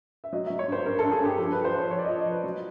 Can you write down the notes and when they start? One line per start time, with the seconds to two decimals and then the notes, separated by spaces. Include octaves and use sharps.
0.24 E5
0.33 F#3 D#5
0.46 F#3 E5
0.59 C#5
0.68 G2 C5
0.85 G2 A#4
0.99 G2 A4
1.12 G#4
1.21 G2 G4
1.38 F3 A4
1.52 F3 B4
1.64 C5
1.74 F3 C#5
1.91 F3 C#5
1.98 D5
2.04 F3 D#5
2.18 D#5
2.26 F3 B4
2.44 F#3